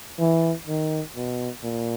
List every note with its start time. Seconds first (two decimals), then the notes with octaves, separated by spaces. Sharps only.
0.19 E3
0.68 D#3
1.16 B2
1.64 A#2